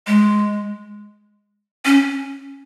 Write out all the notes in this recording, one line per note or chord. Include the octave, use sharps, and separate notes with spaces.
G#3
C#4